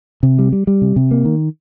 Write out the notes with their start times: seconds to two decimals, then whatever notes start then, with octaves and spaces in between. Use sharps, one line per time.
0.23 C3
0.39 G3
0.52 G3
0.67 G3
0.82 C3
0.96 C3
1.11 A#3
1.25 D#3